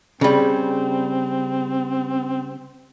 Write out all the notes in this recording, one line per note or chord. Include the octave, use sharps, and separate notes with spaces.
C#3 G3 C4